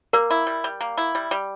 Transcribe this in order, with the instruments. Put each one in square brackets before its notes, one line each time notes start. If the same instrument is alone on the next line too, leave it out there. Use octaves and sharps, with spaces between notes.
[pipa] A#3 [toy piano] A#4
[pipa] E4
G3
G3
A#3
E4
G3
G3